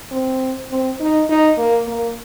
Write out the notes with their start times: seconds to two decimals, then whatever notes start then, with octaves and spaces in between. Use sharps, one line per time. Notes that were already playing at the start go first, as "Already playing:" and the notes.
0.12 C4
0.71 C4
1.00 D#4
1.29 D#4
1.58 A#3
1.87 A#3